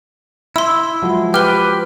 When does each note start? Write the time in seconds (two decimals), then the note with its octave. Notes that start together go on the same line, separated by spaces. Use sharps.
0.56 E4 C6 E6
1.02 F3 F#3 G#3
1.34 G4 B4 F6 G7